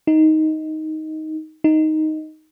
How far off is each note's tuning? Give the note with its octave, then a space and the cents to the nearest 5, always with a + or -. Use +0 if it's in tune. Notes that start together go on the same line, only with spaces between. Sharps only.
D#4 +10
D#4 +5